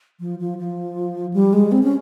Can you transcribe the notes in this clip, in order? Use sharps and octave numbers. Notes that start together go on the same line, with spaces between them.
F3
F3
F3
G3
G#3
C4
C#4